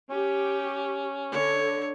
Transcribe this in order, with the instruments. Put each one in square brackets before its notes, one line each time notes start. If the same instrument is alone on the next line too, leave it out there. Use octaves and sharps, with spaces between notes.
[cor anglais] C#4 [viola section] G4
[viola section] D3 [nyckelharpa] C#5